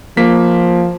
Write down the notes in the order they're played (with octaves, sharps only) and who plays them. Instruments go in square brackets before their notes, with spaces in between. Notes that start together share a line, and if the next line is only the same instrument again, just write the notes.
[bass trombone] F3 [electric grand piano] A#3 B6